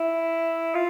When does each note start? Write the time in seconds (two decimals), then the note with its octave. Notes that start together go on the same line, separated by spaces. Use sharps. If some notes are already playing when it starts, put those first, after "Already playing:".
Already playing: E4
0.75 F4